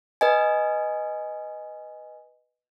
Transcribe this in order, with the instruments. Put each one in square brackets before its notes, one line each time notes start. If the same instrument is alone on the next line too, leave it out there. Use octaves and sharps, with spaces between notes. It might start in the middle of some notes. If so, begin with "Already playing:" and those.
[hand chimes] B4 D#5 G#5